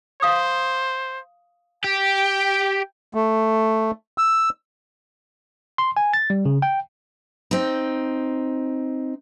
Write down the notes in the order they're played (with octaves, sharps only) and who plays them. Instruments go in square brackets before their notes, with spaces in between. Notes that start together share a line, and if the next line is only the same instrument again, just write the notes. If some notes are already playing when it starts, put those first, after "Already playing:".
[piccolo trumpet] C5 [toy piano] F5 D#6
[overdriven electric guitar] G4 [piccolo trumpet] G5
[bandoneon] A3
E6
[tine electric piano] C6
G#5
A6
G3
C#3
G5
[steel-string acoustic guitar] C4 D#4